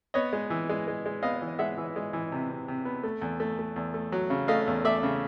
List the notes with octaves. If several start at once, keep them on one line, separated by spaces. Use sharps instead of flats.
B3 C#5 D#5
G#3
E3
G#3
G#3
G#3
B3 D#5 F5
E3
G#3 E5 F#5
E3
G#3
E3
C3
C3
C3
B3
A3
E2
A3
A3
E2
A3
F#3
C#3
A3 D#5 F5
E2
A3 D5 E5
C#3